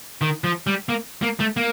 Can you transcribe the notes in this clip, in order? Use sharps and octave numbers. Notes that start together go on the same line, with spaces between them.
D#3
F3
G3
A#3
A#3
A3
A#3